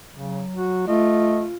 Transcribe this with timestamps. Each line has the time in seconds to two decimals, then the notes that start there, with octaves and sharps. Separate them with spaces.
0.15 C#3 F#3
0.56 F#4
0.88 A3 F4 D#5